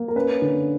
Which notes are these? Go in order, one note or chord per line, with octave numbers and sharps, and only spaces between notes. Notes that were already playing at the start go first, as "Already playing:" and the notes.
Already playing: A#3
A#4
C#4 B4
D3